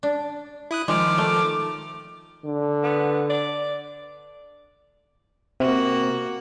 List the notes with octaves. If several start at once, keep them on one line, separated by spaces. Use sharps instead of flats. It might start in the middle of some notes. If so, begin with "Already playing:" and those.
D4
E4 D#6 F#6
D#3 F3 G#3 D6 F6
A3
D3
B3
D5
C3 A#3 F#4